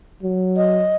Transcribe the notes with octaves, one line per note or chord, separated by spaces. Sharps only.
F#3
D#5